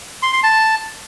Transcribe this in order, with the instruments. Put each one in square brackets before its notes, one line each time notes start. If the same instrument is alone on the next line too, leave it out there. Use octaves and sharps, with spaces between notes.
[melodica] C6
C6
A5